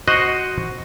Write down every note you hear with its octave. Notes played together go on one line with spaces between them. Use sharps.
F#4 C5 D#5 F#5